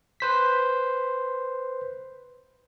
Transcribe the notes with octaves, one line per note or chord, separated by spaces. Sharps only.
B4 C5 B6